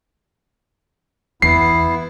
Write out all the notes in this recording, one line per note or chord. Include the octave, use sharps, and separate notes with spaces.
E2 B3 E4 C7